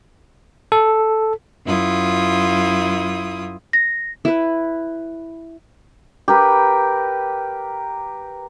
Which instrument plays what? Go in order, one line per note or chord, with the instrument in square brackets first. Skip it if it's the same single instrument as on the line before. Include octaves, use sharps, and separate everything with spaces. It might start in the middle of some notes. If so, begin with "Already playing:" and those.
[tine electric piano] A4
[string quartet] F#2 E4 F4 D#6
[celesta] A#6
[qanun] E4 B4
[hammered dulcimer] G4 A#4 B4